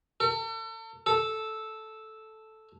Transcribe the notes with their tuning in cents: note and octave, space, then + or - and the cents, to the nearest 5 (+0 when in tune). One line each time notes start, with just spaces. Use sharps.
A4 +40
A4 -5